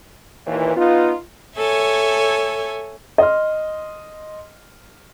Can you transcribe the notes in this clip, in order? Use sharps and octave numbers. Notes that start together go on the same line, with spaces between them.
D#2 A#2 E3
B3 D#4 F4
A4 C#5 E5 G#5
D#5 C6 F6